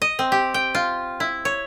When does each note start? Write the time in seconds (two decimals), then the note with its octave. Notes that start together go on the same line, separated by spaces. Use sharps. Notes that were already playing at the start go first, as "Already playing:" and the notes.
0.02 D#5
0.19 C4
0.32 G4
0.54 G5
0.75 F4
1.20 E4
1.45 C#5